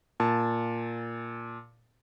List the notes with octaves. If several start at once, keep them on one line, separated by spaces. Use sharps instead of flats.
A#2 A5